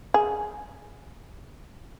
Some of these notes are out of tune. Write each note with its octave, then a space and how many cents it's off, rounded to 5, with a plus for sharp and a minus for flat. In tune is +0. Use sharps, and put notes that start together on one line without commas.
G#4 +10